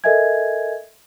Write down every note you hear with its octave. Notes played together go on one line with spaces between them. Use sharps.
A4 A#4 D#5 E5 G#5 G#6